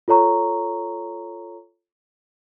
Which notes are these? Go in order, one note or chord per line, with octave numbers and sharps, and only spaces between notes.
F4 A4 C#5 A#5 C#6